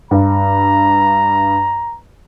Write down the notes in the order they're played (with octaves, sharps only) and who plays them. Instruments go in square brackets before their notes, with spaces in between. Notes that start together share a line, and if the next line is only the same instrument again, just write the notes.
[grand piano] G2 [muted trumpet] A#5